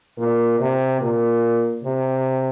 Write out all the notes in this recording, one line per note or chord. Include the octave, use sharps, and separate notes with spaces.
A#2
C3
A#2
C3